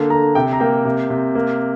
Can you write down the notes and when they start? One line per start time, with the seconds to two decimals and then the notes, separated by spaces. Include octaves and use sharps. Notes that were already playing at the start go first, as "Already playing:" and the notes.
Already playing: D3 A#3
0.10 D3 A#5
0.35 C3 G5
0.53 A#5
0.60 A#3 G5
0.85 C3
1.10 C3
1.35 A#3